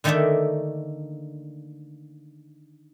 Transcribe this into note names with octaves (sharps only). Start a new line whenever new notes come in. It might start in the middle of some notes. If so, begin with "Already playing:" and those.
D3 D#3 A3 A#3 D5 E5